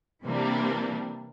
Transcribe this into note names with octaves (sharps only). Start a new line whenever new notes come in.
C3 E3 G3 A#3 D4